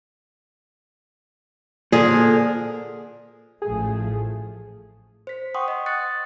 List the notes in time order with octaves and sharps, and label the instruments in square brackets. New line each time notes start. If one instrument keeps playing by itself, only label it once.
[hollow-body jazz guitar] A#2 [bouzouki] D3 F3 A#4 [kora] G#4
[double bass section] A1 F3 A3 [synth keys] G#4
[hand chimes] C5 B6
F#5 G5 C6 C#6 D#6
D#5
D#6 F#6 A6 C#7